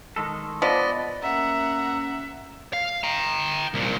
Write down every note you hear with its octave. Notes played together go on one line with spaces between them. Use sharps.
D#3 G#3 A4
F3 B3 D5 D#5
A#3 C#4 E5 F#5 A#5
F5
G5 A#5
C2 A#2